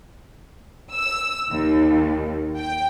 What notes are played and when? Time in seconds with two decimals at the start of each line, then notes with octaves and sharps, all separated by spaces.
0.94 E6
1.49 D#2
2.58 G5